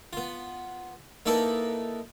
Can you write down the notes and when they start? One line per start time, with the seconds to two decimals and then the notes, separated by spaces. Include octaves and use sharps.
0.13 B3 F4
1.26 A#3 D#4 E4 A4 B4